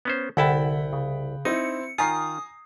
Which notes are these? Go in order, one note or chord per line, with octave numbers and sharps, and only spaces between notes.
B3 C#4 C5
C2 D3 E4 F#5 G5 A5 B5
C#3
C4 D#4 E4 C#7
D#3 F4 G#5 A#5 D#6 C7